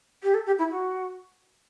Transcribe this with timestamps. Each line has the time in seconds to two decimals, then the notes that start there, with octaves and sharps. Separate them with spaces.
0.22 G4
0.34 A4
0.46 G4
0.58 E4
0.71 F#4